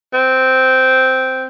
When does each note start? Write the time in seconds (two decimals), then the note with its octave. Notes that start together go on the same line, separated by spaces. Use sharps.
0.13 C4